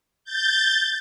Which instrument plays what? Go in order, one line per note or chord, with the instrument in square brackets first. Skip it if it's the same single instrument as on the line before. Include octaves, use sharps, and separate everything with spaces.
[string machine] G6 A6